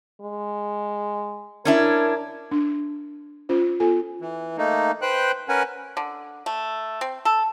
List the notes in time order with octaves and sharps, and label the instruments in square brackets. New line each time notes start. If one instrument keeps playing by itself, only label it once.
[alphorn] G#3
[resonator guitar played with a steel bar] C#4 D4 E4 [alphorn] A#4
[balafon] D4
C#4 F4 C5
B3 F4 A4 G#5
[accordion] E3
A3 A#3 D#4
B4 C5 G5 F#6
C#4 A#4 B4 F#5 G#5
[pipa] D3
A3
C4
A4